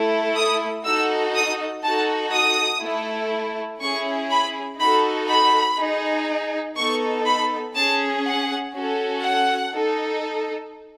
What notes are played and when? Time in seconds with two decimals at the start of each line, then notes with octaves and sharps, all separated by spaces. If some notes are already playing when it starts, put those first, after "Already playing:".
Already playing: A3 E4 A4
0.36 D#6
0.85 D#4 F#4 A4 E6
1.35 D#6
1.83 D#4 F#4 A4 A5
2.32 D#6
2.82 A3 E4 A4
3.81 C#4 E4 G#4 C#6
4.30 B5
4.79 D#4 F#4 A4 B5
5.29 B5
5.78 D#4 G#4
6.77 B3 D#4 A4 C#6
7.26 B5
7.75 C#4 G#4 A5
8.25 F#5
8.74 C#4 F#4 A4
9.23 F#5
9.73 D#4 A4